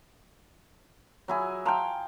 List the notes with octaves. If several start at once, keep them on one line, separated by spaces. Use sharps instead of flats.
F#3 E4 G#4
F5 G5 A5 A#5 C6